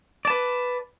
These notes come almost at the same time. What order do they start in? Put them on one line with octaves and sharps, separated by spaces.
D5 A5 B4